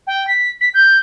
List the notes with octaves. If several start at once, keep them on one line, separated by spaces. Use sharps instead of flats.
G5
B6
B6
G6